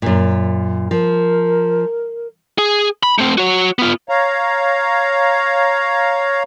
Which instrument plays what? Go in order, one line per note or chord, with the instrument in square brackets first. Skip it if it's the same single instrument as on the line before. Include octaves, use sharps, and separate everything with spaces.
[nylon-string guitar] F#2 A#2
[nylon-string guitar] F3 [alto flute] A#4
[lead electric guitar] G#4
B5
A3 C4
F#4 C#5
B3 F4
[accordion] C#5 F5 A#5